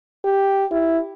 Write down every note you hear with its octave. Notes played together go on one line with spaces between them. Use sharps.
G4
E4